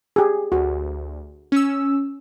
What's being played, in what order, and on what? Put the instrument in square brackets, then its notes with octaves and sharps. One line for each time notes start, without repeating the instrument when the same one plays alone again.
[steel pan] G4 G#4
[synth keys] D2 [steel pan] F#4
[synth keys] C#4 E6